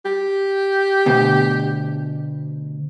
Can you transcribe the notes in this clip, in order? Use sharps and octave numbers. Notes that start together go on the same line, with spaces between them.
G4
D2 B2